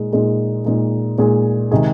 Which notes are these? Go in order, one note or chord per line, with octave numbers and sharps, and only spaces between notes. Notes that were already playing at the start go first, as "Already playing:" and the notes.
Already playing: A#2 G#3 D#4
A#2 G#3 D#4 G#4
A#2 G#3 D#4 G#4
A#2 G#3 D#4 G#4
C3 D#3 G#3 D#4 G#4